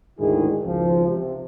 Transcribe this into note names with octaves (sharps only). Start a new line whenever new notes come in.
D2 G#2 D#3 E4 G#4
G#1 C#2 F3
C3